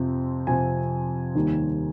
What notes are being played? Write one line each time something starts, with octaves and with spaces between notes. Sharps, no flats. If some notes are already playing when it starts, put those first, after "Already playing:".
Already playing: F2 C3 F3 C4
F2 C3 F3 C4 G#5
D#2 D#3 G3